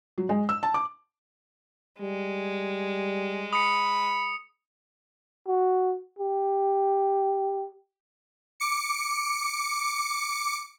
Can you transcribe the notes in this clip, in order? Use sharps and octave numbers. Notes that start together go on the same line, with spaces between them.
F#3
G#3
E6
A5
D6
G3 G#3
B5 D#6 C#7
F#4
G4
D6 C#7